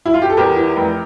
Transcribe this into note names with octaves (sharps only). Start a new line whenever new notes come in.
E4
F4
G4
A4
E2 G4 A#4
E3
F1